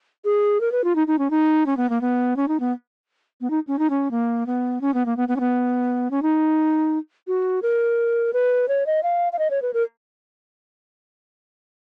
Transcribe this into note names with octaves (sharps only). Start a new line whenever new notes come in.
G#4
A#4
B4
F4
D#4
D#4
C#4
D#4
C#4
B3
A#3
B3
C#4
D#4
B3
B3
D#4
C#4
D#4
C#4
A#3
B3
C#4
B3
A#3
B3
B3
C#4
B3
C#4
D#4
F#4
A#4
B4
C#5
D#5
F5
F5
D#5
C#5
B4
A#4